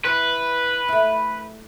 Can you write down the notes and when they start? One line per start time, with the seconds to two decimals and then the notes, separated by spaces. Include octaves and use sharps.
0.05 E3 B4
0.88 A3 E4